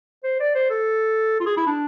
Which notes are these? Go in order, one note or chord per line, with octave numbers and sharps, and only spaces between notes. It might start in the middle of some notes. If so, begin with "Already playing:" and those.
C5
D5
C5
A4
F4
G#4
E4
D4